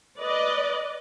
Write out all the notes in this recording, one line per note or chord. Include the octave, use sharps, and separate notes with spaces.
B4 D5 D#5